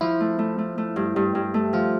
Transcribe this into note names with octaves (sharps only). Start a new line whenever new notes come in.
F3 E4
A3
A3
A3
A3
G2
G2
G2
A3
F3 F4